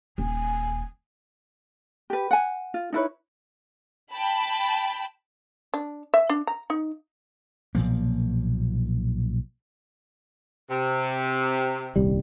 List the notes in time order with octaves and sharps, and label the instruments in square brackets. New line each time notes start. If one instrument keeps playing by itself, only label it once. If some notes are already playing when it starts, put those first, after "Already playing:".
[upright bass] D#1 [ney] G#5
[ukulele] G4 B4
F#5 G#5
F4
D#4 E4 B4 C#5
[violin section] G5 A5 B5
[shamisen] D4
E5
D4
A#5
D#4
[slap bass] B1 A#2 F3 A#3
[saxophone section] C3
[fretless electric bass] D#1 C2 G3